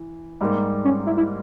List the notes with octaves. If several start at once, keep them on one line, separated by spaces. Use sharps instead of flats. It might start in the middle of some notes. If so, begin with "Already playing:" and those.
Already playing: E3
G#2 G3 A#3
C#4
E4
E4